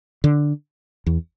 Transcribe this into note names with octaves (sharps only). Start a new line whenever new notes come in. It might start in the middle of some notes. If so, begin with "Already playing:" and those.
D3
E2